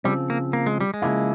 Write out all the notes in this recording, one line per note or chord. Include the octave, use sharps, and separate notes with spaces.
C#3 F3 G3 C4
A#3
A#3
G#3
G3
G#3
C#3 F3 A#3 E4